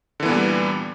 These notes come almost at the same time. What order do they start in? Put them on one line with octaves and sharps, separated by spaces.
D3 E3 B3 A#2 G3